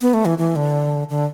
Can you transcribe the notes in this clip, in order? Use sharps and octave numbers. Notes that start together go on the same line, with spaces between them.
B3
A3
E3
E3
D3
D3